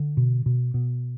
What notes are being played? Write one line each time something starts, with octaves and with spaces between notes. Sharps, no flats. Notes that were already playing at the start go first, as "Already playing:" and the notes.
Already playing: D3
B2
B2
B2